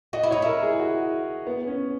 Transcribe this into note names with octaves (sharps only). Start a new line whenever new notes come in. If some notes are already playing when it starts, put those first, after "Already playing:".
F#4 D#5
E4
D#4 C#5
E4 A#4
G#4
F#4
B3
C#4